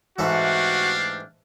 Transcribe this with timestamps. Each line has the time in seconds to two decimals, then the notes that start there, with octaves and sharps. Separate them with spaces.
0.19 G#2 E3 A3 D4 F#4 G4 F5